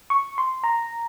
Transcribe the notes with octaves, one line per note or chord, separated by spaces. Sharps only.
C#6
C6
A#5